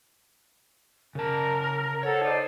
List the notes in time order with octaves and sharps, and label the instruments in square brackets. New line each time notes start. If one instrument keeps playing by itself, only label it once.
[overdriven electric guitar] C#3 A5 [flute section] A#4
[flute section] A4 C5 F#5 [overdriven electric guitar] C#5
[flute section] D#4 C5 D5